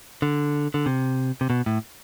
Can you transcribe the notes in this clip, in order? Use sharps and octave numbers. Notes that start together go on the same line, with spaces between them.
D3
D3
C3
C3
B2
A2